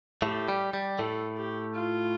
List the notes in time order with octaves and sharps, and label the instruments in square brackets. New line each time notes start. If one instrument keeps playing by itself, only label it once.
[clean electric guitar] A2 A3 [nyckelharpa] G4
[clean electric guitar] G3
G3
[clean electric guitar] A2 A3 [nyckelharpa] A4
[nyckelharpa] G4
F4